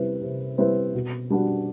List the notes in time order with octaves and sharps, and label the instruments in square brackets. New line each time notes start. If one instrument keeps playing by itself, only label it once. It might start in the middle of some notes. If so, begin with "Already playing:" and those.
Already playing: [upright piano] C3 G3 C4 E4 B4
C3
G3 C4 E4 B4
B2
G3 D4 F#4